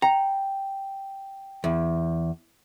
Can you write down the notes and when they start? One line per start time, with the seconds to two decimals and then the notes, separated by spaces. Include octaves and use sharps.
0.02 G5 A#5
1.64 E2